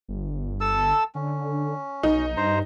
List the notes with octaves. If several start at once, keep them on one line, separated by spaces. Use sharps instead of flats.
G1
A4 A5 E6
D3 C#4
B1 D#4
G2 C5 A#5